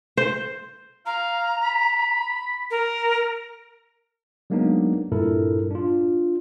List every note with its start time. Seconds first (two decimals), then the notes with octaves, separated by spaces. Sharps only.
0.17 C5
1.06 F5 A#5
1.63 B5
2.71 A#4
4.50 F#3 G#3 A#3 B3 D4 D#4
5.12 G2 A#2 E4 A4 A#4
5.71 D4 F4